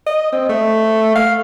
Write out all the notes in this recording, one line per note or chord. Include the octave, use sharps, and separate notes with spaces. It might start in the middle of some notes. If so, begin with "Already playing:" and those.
D#5
C4
A3
F5